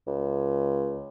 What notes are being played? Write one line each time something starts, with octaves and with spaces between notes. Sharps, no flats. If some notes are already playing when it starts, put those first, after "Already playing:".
C#2